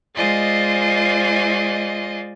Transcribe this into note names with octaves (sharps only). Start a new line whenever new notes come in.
G#3 F4 C5 D5 D#5 G#5